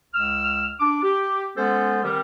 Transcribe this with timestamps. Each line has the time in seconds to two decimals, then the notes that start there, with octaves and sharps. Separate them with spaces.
0.14 C#2 E6 F6
0.80 D4 D6
1.02 G4
1.56 G#3 B3 C#4 A4 C5
2.03 D#3 G3 C4 G4 A#4